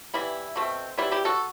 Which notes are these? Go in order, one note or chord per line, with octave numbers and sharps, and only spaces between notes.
E3 G3 B3 E4
B2 A3 C4
E3 G3 B3 E4
E4 G4
F#4 A4